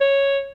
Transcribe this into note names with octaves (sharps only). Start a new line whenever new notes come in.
C#5